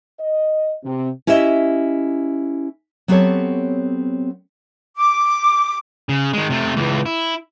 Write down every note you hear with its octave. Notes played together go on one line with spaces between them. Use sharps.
D#5
C3
C#4 E4 G4 D#5 E5
F#3 B3 C4 G4 A4 C#5
D6
C#3
D#3 G#3
C3 A3
C#2 E3
E4